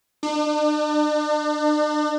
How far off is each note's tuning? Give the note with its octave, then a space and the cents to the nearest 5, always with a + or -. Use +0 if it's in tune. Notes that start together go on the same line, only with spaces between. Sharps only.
D4 +40